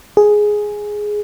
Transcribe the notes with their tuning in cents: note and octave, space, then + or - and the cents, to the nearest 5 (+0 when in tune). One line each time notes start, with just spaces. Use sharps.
G#4 +5